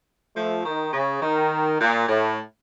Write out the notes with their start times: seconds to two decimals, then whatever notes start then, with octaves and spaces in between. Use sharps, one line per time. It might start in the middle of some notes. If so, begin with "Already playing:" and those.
0.36 F3 A3
0.66 D#3
0.93 C#3
1.22 D#3
1.81 A#2
2.09 A2